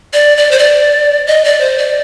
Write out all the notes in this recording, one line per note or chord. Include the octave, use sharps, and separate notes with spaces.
D5
D5
C5
D5
D#5
D5
C5
D5